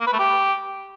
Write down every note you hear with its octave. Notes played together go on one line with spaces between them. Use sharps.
A#3
B4
A3
G4